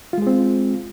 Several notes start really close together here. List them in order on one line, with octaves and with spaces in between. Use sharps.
F4 G#3 G#4 C4